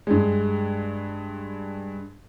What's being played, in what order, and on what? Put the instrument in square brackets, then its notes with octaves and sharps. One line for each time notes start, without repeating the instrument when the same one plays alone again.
[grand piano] G2 G#3